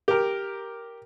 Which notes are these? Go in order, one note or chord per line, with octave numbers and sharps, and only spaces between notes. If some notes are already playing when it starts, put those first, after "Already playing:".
G4 A#4